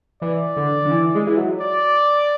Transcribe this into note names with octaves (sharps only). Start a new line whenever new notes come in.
E3 D5
D3
D3
E3
G#3
E3
F#3
D5